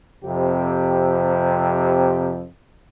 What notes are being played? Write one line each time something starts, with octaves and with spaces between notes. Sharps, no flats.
F2 C3 G4